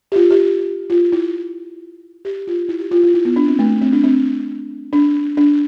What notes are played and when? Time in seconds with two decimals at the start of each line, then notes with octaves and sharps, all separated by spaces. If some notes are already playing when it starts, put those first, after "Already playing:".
0.12 G4
0.16 F4
0.31 G4
0.90 F4
1.12 E4
2.25 G4
2.47 F4
2.69 E4
2.80 G4
2.91 F4
3.03 F4
3.14 E4
3.25 B3
3.36 D4
3.48 C4
3.59 A3
3.81 C4
3.93 D4
4.04 C4
4.93 D4
5.37 D4